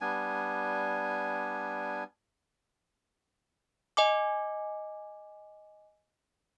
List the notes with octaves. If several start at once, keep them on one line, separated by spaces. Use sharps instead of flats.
G3 B3 D4 G#5
D#5 G#5 D6